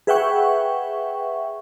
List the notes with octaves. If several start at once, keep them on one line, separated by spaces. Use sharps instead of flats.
G#4 B4 E5 F#5 G5 C#6